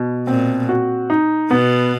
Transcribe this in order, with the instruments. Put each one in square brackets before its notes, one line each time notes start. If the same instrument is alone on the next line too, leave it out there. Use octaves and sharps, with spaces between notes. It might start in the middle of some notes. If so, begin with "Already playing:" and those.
Already playing: [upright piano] B2
[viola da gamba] A#2 [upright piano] C4
[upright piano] F#4
D#4
[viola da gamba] B2 [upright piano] B3